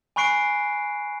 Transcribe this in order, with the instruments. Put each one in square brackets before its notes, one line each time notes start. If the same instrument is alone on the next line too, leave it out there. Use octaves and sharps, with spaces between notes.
[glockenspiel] G#5 B5 C#6 F#6 C7 D7